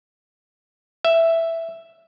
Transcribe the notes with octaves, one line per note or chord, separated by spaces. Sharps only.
E5